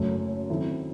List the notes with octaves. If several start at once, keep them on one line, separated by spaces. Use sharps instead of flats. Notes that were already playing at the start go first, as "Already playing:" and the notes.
Already playing: F#1 F#2 F#3 A3
D#3 F#3 C4 E4 A4